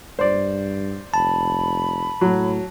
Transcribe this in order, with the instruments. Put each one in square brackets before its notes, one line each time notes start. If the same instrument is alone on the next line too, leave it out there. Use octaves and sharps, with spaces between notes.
[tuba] G2 [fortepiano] C5 D5
[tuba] F1 [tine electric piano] A5 [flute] B5
[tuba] A2 [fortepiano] F#3